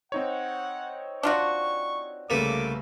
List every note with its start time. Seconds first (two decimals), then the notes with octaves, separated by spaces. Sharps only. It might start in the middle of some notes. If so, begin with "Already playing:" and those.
0.12 C4 D#4 C#5 F#5
1.23 D4 F4 F#4 C#6
2.30 C2 C#3 A3 A#3 A4 B4 D6